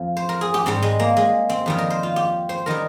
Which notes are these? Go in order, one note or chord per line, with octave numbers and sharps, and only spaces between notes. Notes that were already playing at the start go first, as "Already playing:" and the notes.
Already playing: F2 F3
C5
A#4
G#4
G4
G#2 G3 C4
G#3
A#3
G#3
C4
F2 D#3 G3
A#4
C5
F4
G4
C5
D#3 G3 A#4